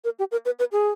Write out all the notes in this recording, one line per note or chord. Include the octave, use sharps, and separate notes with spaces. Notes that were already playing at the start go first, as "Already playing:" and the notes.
A#4
G4
A#4
B4
B4
G#4